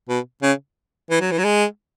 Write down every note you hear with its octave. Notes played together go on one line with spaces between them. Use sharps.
B2
C#3
E3
F#3
E3
F#3
G#3